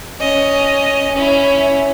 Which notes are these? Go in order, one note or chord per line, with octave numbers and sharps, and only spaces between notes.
C#4 D#5
C#4 E4